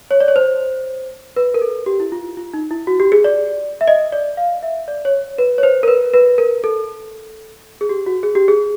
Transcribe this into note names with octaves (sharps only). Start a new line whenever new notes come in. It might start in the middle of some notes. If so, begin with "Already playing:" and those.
C#5
D5
C#5
C5
B4
A#4
A4
G4
E4
F4
F4
D#4
E4
F#4
G4
G#4
D5
E5
D#5
D5
F5
E5
D5
C#5
B4
C#5
C5
A#4
B4
B4
A#4
A4
G#4
G4
F#4
G#4
G4
G#4